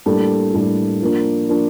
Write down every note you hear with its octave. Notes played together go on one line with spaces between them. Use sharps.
A2 G3 A#3 D4 A4
A2 G3 A#3 D4 A4
F3 A#3 D4
F3 A#3 D4